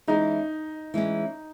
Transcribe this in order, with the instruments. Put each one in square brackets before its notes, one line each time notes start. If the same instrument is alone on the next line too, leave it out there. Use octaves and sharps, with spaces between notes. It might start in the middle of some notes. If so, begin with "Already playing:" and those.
[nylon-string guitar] E3 G#3 C#4 [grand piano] D#4
[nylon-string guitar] E3 G#3 C#4